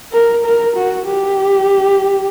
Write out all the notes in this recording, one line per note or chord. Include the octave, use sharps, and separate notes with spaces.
A#4
A#4
F#4
G4